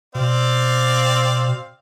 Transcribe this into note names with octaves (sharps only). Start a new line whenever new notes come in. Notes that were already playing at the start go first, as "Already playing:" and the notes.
B2 C4 D5 F5